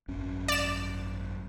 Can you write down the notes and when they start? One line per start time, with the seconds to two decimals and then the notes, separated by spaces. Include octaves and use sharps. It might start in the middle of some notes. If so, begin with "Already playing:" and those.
0.08 G#1 F#2 C#4
0.48 D5 E7